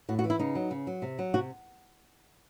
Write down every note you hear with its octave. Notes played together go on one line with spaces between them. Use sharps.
A2 F#4
F#4
E3
E4
C#3 D#4
F#3
C#3
F#3
C3
F#3
C3 F#4